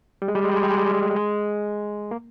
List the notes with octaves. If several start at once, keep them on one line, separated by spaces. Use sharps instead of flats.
G3
G#3
G3
G#3
G3
G#3
G3
G#3
G3
G#3
G3
A3
G#3
A#3